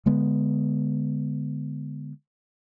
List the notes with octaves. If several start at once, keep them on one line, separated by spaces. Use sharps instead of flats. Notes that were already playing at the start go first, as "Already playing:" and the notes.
D3 G#3 B3